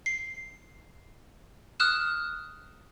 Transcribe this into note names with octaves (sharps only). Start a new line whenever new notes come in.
C7
D#6 F6 F#6 E7